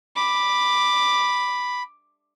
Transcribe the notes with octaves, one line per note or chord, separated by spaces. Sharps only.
B5 D6